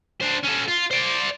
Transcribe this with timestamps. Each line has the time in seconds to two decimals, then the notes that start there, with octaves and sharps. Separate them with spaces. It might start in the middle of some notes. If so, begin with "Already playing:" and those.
0.21 D4 C5
0.43 C#4 A4
0.68 F4
0.91 C5 D5